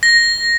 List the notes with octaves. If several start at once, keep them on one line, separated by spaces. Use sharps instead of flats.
A#6